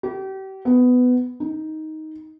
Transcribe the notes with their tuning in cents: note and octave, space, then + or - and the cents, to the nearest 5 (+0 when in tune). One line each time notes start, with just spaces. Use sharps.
G4 -35
B3 +15
D#4 +10